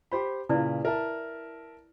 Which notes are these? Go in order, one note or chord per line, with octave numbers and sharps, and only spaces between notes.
G4 C5 B5
A#2 C#3 E4 B4 D5
A#4 E5 A5